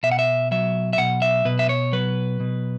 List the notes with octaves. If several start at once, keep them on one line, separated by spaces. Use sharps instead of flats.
B2 E5
F#5
E5
F#3 E5
E5
B2 F#5
E5
B2 B4
E5
C#5
F#3 B4
B2